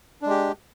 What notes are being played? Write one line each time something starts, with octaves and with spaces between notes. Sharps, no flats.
G#3 D4 G4